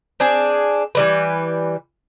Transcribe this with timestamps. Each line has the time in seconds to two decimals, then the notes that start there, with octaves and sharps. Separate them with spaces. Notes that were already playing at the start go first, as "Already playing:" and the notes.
0.20 C4 D4 G#4
0.95 E3 G3 B4